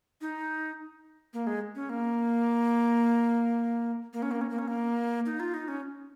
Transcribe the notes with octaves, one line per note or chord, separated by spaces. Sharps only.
D#4
A#3
G#3
C#4
A#3
A#3
C#4
A#3
C#4
A#3
C#4
A#3
D#4
F4
D#4
C#4